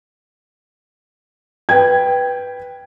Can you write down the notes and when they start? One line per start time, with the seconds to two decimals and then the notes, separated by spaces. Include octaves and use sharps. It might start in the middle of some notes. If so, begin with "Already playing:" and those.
1.69 B4 G5 G#6